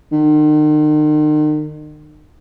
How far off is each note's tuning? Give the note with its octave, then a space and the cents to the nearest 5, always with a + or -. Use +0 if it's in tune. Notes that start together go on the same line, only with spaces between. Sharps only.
D#3 -40